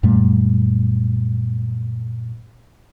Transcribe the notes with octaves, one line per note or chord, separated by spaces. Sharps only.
F#2 A#2 G3 A3